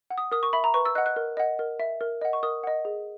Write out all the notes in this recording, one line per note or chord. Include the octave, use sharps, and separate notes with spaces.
F#5
D#6
A#4 D#6
C#6
E5 B5
A#5
B4 C#6
E6
D#5 F#5 F#6
F#6
A#4
D#5 F#5
A#4
E5
A#4
D#5 F#5
C#6
A#4 D#6
D#5 F#5
G#4